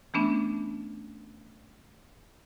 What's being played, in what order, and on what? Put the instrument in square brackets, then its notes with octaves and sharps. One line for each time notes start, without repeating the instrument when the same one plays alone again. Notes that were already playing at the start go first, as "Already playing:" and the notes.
[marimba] E3 A3 B3 C#4 D4